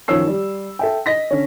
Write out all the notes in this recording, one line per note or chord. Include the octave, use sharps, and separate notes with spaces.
F#2 D#3 F3 C#5 E6 C7
G3
A4 E5 G5
D#5 A#6 B6
D3 C#4